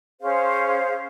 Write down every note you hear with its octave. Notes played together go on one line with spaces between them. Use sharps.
C#4 G#4 C5 F5